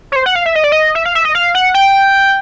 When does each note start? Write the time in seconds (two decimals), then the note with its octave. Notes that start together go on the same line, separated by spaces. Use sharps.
0.12 C#5
0.16 C5
0.26 F#5
0.35 F5
0.46 E5
0.55 D#5
0.64 D5
0.72 D#5
0.95 E5
1.05 F5
1.15 E5
1.25 D#5
1.35 F5
1.55 F#5
1.74 G5